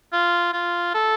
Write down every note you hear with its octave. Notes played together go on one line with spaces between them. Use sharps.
F4
F4
A4